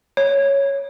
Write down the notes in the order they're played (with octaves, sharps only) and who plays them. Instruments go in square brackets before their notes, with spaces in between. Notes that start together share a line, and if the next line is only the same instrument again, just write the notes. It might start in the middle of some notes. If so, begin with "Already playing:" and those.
[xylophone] C#5